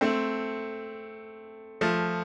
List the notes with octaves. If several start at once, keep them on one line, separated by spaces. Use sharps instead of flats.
A3 C4
F3 A3